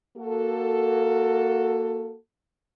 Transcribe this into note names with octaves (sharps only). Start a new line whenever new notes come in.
A#3 F#4 A4